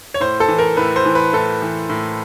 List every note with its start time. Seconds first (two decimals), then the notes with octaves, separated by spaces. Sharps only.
0.14 C#5
0.20 A2 C5
0.40 A4
0.49 E3
0.59 A#4
0.77 A2 B4
0.96 C5
1.06 E3
1.15 B4
1.33 A2 A4
1.62 E3
1.89 A2